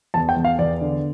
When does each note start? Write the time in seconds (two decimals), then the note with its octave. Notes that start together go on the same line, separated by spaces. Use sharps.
0.14 E2 A5
0.29 G5
0.36 E2
0.44 F5
0.59 E2 D5
0.81 D3